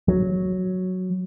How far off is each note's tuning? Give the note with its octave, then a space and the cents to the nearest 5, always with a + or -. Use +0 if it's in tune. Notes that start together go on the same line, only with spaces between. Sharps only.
F#3 +0